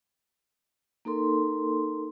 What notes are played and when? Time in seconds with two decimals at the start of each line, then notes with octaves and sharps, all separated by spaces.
1.05 A#3 D#4 A4 A#4 C6